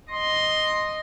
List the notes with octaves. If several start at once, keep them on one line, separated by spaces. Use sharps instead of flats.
D#5 C6